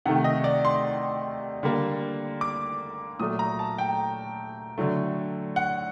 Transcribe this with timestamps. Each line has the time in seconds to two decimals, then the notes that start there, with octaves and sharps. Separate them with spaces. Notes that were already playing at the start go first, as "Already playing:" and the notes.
0.06 C3 D#3 A3 F#5
0.24 D#5
0.44 D5
0.65 C6
1.63 D3 G3 A#3
2.41 D6
3.20 A#2 F#3 A3 D#6
3.39 A#5
3.59 A5
3.78 G5
4.78 D3 F#3 A3
5.56 F#5